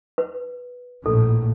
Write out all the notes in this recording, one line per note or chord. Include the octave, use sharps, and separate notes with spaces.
B4
A#1 A2 A4